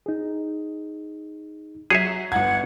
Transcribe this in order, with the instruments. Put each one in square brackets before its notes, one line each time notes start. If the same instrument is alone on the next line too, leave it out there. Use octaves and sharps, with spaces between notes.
[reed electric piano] D#4 G#4
[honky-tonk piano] F#3 [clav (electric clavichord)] G#4 C#5 E5
[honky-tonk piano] G1 G#6 [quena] F#5